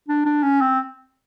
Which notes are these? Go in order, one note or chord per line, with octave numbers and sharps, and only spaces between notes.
D4
D4
C#4
C4